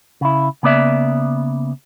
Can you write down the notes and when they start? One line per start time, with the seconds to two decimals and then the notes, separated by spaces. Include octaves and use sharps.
0.21 C#3 E4
0.63 C#3 A#3 B3 D5 E5